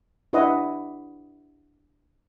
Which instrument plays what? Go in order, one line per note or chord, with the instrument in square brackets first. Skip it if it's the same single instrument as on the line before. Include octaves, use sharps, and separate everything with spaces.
[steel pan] D4 E4 G4 B4 D#5 F#5